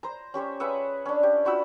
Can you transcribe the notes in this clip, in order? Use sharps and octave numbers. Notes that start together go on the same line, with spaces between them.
C5 A#5
C#4 G4 C5 C#5
G#4 B4 E5 F#5
C#4 D4
G4
F4 F#4 B5 E6